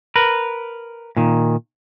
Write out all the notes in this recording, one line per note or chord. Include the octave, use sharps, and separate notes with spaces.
A#4 B4
A#2 D#3